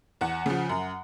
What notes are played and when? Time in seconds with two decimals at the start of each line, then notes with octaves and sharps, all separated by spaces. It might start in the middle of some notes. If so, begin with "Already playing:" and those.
0.21 E2 F#5
0.46 C#3 F3
0.69 F#2